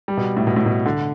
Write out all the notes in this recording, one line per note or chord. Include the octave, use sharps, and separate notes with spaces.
G3
B2
A2
B2
A2
B2
D3